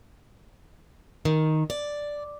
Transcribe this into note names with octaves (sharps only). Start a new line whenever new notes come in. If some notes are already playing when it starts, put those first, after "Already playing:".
D#3
D5